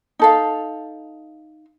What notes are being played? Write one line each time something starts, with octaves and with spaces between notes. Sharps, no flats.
D#4 A4 F5